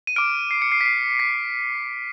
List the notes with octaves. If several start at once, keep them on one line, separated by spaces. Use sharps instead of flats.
D#7
D6 F6 D7
C7
C#7
C7
B6
C7
B6